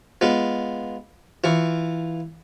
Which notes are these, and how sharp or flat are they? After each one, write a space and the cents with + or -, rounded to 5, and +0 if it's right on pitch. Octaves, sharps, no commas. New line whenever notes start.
G#3 +0 B3 +0 F4 +0
E3 +0 F4 +0 C#6 +0